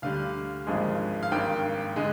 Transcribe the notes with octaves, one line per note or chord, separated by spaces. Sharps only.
D2 D3 G3 F5
G#1 G2 F3 G#3
F5
G#1 G2 D#3 G5
D3 G#3